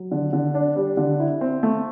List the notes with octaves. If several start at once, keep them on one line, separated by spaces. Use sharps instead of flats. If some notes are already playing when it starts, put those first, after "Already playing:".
Already playing: F#3
D3
D3
D4
G3
D3
E4
C4
A3